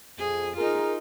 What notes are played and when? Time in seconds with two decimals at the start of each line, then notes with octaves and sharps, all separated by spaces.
0.18 F2 G#4
0.57 D#4 F4 G#4 A#4